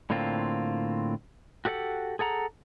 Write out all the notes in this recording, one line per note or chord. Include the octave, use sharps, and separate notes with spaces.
A2 D3 A#3 C4 F4
F#4 G4 A4 D5 F#5
G#4 A4 F#5 A#5